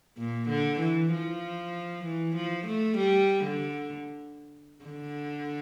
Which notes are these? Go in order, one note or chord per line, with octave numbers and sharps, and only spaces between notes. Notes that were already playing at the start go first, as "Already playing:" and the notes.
A#2
D3
E3
F3
E3
F3
A3
G3
D3
D3